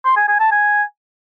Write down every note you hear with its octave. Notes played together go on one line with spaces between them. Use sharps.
C6
G#5
G#5
A5
G#5